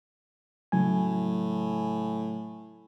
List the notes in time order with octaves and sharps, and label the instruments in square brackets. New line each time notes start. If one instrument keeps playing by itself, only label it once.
[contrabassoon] A2 [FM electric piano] C#3 F#3 G#5